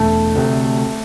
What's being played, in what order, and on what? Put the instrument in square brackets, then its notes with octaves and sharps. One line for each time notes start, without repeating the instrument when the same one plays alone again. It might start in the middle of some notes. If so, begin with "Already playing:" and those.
Already playing: [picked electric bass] E1 [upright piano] A3
[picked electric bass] D2 C3